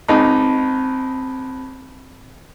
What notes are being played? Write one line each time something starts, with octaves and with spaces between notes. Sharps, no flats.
C#2 C4 D#4 A5 B5